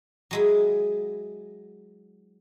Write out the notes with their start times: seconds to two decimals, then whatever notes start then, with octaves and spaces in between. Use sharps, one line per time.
0.31 F#3 G#3 E4